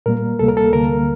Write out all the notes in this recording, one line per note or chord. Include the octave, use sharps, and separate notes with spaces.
A#2 G3 A#3 A#4
D2 C3 G3 A#3 A4
A#4
A4
D2 D3 G3 A#3 A#4